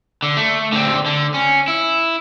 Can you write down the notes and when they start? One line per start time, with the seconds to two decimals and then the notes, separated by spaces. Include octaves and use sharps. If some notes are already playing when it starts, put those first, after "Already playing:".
0.23 D3
0.37 A3
0.72 D3 C4
1.06 D3
1.34 C#4
1.68 E4